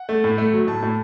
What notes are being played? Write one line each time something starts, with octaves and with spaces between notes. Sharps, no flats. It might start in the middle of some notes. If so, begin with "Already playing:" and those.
Already playing: F#5
A3
A2
A3
F#3
A2 A5
A2